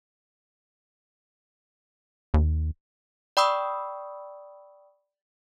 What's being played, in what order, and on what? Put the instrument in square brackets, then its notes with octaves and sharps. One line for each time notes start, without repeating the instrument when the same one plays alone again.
[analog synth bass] D#2
[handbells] D5 G5 B5 C#6 D#6 E6